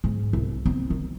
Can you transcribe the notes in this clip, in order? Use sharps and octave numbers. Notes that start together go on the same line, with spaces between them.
G#2
C2
C4
D#3